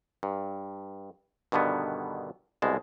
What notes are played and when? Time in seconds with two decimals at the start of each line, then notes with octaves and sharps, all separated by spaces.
0.23 G2
1.52 G2 B2 D3 D#3 B3
2.62 C2 B2 G#3 A5